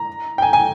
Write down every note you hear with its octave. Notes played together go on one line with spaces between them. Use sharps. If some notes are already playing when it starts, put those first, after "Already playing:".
Already playing: A#5
G5
G#5
G#5